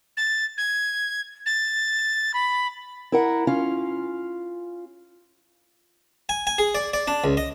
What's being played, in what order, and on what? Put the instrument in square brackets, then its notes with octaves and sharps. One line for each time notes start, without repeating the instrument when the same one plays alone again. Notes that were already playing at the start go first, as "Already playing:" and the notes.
[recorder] A6
G#6
A6
B5
[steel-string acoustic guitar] E4 A#4 F#5
C#4 F4 F5
[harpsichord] G#5
G#5
G#4
D5
D5
D4
C#2
D#5